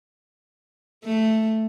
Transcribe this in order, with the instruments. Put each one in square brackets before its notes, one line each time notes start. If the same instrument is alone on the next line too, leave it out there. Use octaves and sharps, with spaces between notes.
[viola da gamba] A3